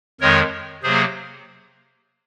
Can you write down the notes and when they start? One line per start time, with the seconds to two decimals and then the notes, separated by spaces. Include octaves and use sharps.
0.20 F2 D#3 G#3 A#4 C#5
0.83 C3 F#3 A#3 G#4 C5